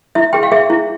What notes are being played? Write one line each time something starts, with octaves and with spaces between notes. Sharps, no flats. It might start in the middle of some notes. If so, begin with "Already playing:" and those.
E4 E5
G#4 G5
F5
G#4 E5
E4